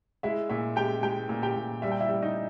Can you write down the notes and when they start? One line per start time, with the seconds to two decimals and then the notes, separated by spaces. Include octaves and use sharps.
0.23 G#3 E4 E5
0.49 A#2 E4 E5
0.76 G#3 G4 G5
1.03 G#3 G4 G5
1.29 A#2
1.42 G4 G5
1.56 A#2
1.82 G3 E5
1.92 G5
2.01 E4 E5
2.09 G3
2.22 D#4 D#5